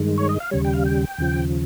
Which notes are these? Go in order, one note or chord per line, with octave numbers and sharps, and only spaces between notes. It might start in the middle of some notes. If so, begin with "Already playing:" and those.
Already playing: G2 D#3 G#3
C#5
D#5
F5
D#2 C#3 G3 C#5
G5
F5
G5
D#2 C#3 F3